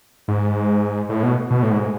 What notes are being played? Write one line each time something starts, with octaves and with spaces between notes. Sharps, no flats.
G#2
A2
B2
B2
A2
G#2